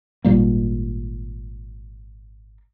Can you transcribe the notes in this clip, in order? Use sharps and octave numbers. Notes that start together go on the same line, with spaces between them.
G#1 A#2 G3 A#3